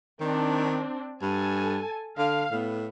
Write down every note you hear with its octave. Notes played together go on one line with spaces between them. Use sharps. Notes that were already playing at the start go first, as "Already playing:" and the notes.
D#3 C4 D4
G2 A4 G#5 A5
D3 F5
A2 B3